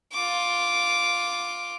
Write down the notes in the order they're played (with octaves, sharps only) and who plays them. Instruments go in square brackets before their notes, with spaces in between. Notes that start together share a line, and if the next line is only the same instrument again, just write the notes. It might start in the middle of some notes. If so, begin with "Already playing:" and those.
[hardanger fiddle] F4 D6